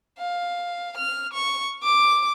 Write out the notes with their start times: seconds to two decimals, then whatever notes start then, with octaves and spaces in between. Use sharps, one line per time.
0.19 F5
0.97 F6
1.33 C#6
1.83 D6